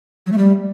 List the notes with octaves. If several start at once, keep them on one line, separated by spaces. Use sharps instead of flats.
F#3
A3
G3